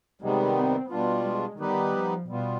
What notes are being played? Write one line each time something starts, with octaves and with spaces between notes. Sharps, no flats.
C3 D#3 G3 G#3 B3
C4
B2 G3 B3 D4 F4
G#3
D#3 G3 B3 D#4 G4 B4
F3
B2 G3 B3 F4